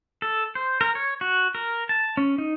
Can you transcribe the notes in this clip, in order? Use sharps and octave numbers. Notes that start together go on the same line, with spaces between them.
A4
C5
A#4
C#5
F#4
A#4
A5
C#4
D#4